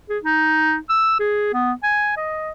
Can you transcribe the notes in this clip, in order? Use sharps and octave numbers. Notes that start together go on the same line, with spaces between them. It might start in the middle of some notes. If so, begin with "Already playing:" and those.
G#4
D#4
E6
G#4
B3
G#5
D#5